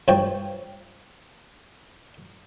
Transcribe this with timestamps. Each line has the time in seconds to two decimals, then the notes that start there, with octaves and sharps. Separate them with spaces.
0.08 G2 F3 G3 C#5 G5